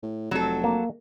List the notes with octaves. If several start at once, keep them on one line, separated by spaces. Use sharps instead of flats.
A2
F1 F#3 A4
A#3